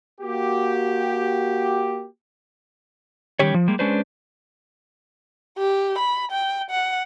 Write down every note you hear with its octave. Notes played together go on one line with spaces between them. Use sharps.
A#3 F#4 G4
D#3 G3 C#4 G4 C#5
F3
G3 G#3 A#3
G#3 C#4 D4 B4 C5
G4
B5
G5
F#5